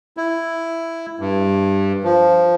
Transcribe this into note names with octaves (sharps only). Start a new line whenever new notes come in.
E4
G2
F3